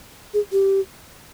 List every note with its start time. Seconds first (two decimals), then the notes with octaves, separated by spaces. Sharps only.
0.34 G#4
0.52 G4